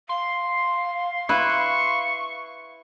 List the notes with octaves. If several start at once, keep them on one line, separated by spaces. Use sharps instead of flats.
F5 C6
E4 B4 C#6